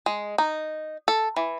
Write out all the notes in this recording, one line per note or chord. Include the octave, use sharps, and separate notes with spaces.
G#3
D#4
A4
E3